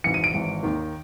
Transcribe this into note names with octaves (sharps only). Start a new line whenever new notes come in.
G#1 G#2 E3 C#7
D#7
D7
G#1 G#2 E3
D#2 D#3